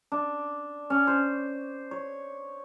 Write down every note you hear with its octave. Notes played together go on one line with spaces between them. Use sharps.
D4
C#4
C5
C#5